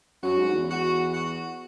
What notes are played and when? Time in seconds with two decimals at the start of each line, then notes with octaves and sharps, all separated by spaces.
0.22 F#2 F#4
0.37 G#2
0.53 E2
0.68 F#4
1.13 F#4